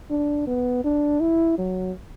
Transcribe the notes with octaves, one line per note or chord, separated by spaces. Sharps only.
D4
B3
D4
E4
F#3